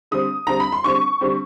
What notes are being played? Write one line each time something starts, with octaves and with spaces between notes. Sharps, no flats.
D3 G3 C4 D#6
D3 G3 C4 A#5
B5
C6
D3 G3 C4 C#6
D3 G3 C4